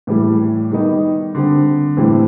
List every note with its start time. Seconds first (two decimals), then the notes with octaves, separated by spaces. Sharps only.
0.07 A2 E3 G3
0.71 D#3 G3 B3 D#4
1.35 D3 G3 C4
1.97 A2 E3 G3 C4